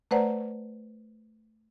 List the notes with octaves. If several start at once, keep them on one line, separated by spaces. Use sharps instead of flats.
A3 B4 C5 D5 F#5 A#5